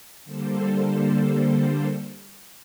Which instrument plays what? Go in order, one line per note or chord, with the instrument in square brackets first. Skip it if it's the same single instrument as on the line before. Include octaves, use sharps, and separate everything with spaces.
[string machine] D3 G3 A#3 A4 C5